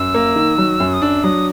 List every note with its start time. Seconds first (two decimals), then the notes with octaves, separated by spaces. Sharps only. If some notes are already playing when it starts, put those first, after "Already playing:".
Already playing: F#2 E6
0.14 A#3
0.36 D#3
0.58 F#3
0.80 F#2
0.94 D#6
1.02 D4 E6
1.24 F#3 D#6